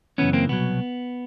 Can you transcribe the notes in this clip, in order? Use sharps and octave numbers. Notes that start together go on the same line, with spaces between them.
F#2 C#3 E3 B3 C#4
A#3 C4
C2 B2 F#3 B3